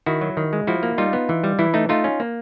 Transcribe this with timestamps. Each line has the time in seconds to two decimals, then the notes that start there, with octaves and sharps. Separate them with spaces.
0.06 D#3 E4 F#4
0.21 F#3
0.37 D#3
0.53 G#3
0.67 F3 E4 F#4
0.83 A#3
0.98 G3 D#4 F4
1.13 B3
1.29 E3
1.44 G3
1.59 E3 E4
1.74 A3 D#4
1.89 A3 D#4 F4
2.04 C#4
2.20 A#3